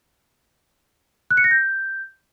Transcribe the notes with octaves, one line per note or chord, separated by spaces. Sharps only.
F#6
C#7
A#6
G6